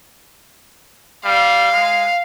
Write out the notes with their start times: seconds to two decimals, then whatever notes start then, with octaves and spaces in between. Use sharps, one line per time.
1.25 G3 F5
1.72 G#3